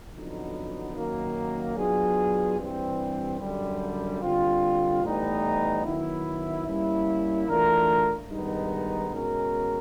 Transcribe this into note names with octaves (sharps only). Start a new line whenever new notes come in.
F2 D3 F#3 B3 D#4
F#2 D#3 F#3 A#3
F#3 B3 D4 F4 G#4
G2 E3 G3 C4
F#2 D3 G3
D3 G3 C4 F4
A2 E3 G3 B3 D#4
D#3 F#3 B3 E4
G3 A#3 C#4 E4
E3 A3 D4 F4 A#4
G2 D#3 G#3 B3 D#4
B2 G#3 C#4 F#4 A#4